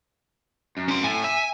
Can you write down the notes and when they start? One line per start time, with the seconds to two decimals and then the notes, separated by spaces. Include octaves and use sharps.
0.77 F#2
0.88 C#4 C6
1.04 A2 G#5
1.24 E5